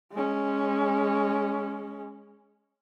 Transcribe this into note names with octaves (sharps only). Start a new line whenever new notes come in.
G#3 C#4